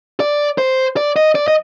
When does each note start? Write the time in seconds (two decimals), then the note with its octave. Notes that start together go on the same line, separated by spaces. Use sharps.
0.20 D5
0.58 C5
0.97 D5
1.16 D#5
1.35 D5
1.48 D#5